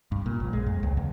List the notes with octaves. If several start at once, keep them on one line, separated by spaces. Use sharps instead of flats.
G2
A#2
A#1
G#3
F2
C#2
E2